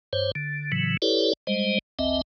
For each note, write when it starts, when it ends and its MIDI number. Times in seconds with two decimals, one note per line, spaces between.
0.13 0.31 43
0.13 0.31 72
0.13 0.31 73
0.35 0.72 50
0.72 0.97 45
0.72 0.97 49
0.72 0.97 52
0.72 0.97 54
1.02 1.33 64
1.02 1.33 67
1.02 1.33 69
1.02 1.33 71
1.02 1.33 73
1.02 1.33 74
1.47 1.79 55
1.47 1.79 56
1.47 1.79 72
1.47 1.79 75
1.99 2.21 32
1.99 2.21 38
1.99 2.21 60
1.99 2.21 75
1.99 2.21 76